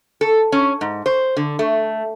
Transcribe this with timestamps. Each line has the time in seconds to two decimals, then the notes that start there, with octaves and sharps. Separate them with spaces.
0.21 A4
0.52 C#4
0.81 G#2
1.06 C5
1.37 D3
1.59 A3